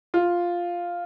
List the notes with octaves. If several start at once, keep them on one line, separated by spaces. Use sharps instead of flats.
F4